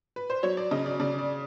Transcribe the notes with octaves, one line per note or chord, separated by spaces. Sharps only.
B4
C5
F#3 C#5
D5
C#3 D#5
D5
C#3 D5
D5